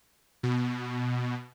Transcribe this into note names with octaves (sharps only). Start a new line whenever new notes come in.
B2